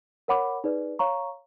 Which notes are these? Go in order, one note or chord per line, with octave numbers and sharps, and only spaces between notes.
A#4 C#5 F#5 B5 D6
D#4 G#4 B4 D5
C#5 F5 A#5 C#6